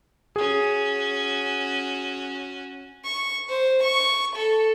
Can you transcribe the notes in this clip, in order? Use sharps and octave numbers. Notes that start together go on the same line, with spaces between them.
C#4 F#4 G#4
C#6
C5
C#6
A4